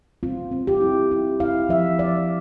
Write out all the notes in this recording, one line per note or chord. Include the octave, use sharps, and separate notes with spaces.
C4 F4
C4
G4
E4
E4
E4 F5
F3 E5
F3 D5